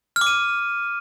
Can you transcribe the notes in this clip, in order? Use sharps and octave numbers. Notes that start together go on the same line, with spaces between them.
F6
D6
D#7